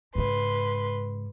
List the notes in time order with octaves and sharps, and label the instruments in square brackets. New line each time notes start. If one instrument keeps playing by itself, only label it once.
[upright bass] G#2 C#3 [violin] B4 C6